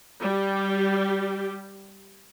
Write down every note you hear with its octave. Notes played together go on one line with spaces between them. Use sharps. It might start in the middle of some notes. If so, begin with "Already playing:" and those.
G3 G4